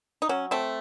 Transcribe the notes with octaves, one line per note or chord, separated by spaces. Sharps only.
D#4
F#3 C#4
A3 C4